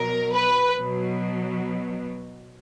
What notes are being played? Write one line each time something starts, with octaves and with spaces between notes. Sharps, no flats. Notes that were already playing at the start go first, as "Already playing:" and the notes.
Already playing: B2 F#3 A#4
B4
B2 F#3